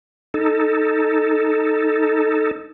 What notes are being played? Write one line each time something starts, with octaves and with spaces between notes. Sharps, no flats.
D#4 A4